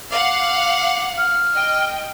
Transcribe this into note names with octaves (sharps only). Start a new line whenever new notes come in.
F5 F#5 D6
F6
D#5 G5